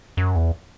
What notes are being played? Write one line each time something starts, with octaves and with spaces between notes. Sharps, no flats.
F#2
E2